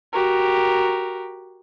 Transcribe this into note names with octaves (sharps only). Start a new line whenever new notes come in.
F#4 G4 A#4